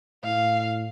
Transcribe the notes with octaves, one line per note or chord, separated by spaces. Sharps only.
A2 F5